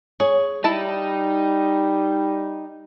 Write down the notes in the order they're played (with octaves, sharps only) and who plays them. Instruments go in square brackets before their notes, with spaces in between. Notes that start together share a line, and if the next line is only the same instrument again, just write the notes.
[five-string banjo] G#4 [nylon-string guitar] C#5
[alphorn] G3 [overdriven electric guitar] D#4 [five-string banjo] E4 A5